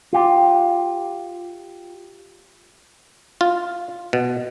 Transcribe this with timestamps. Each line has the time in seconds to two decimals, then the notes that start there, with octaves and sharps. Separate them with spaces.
0.13 F4 G4
3.41 F4
4.13 B2